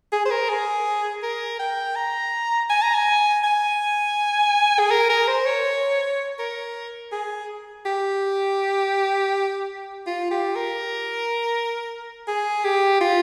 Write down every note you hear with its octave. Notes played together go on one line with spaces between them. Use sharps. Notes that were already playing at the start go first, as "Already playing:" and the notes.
G#4
C5
A#4
G#4
A#4
G5
A#5
G#5
A#5
G#5
G#5
G#4
A#4
A#4
C5
C#5
A#4
G#4
G4
F4
G4
A#4
G#4
G4
F4